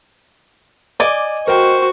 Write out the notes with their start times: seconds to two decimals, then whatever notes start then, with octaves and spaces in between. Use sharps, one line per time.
1.00 D5 D#5 G#5 D6
1.48 F#4 A#4 C5 G5 C#6